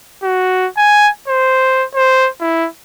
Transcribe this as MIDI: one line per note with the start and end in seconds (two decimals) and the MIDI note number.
0.23 0.67 66
0.77 1.09 80
1.28 1.84 72
1.95 2.28 72
2.41 2.67 64